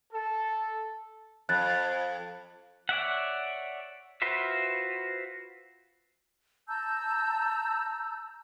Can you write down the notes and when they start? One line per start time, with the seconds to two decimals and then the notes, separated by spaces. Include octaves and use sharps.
0.12 A4
1.49 F2 F#6 A6
2.89 C#5 D5 E5 F#5
4.22 F4 F#4 B4 C5 E5
6.68 A5 A#5 E6 G6